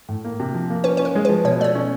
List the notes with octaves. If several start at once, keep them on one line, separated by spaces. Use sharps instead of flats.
A2
A#3
C3
F3
A#3
C#4 B4
C#4 B4
A#4
G#3
F3 B4
B2 C#5
A3 D5
C#5
C#4